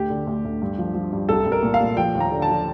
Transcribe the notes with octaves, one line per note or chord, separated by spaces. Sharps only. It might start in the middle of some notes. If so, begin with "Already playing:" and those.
Already playing: D2 G4
D3
D2
D2
G2
F3
F3
G2
C2 A4
C2
A#4
A#2
F5
A#2
F3 G5
D#2
A#5
D3
A5
F3